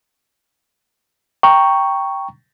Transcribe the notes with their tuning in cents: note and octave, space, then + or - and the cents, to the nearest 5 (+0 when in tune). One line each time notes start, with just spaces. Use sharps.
G5 +0 A#5 +0 C#6 +0